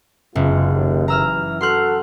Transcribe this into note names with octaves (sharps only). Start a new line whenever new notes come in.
F#1 G#3 B3 F4
D#2
E3 A#5 E6 F6
F#4 A4 C6 F6 F#6